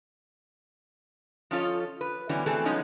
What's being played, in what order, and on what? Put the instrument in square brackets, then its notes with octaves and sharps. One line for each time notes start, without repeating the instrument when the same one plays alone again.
[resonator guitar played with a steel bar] F3 C#4 F4 A4 C#5
B4
D3 E3 F#3 G3 B3 C#4
B2 E3 A3 C4 G#4 A4
F3 F#3 G#3 B3 C#4 D#4